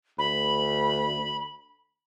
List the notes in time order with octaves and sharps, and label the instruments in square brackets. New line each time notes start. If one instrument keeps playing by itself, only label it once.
[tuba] D2 [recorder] B5